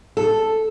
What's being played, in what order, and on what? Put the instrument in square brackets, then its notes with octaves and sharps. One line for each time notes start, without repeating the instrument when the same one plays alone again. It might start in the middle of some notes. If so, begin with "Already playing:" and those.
[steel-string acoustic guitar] A4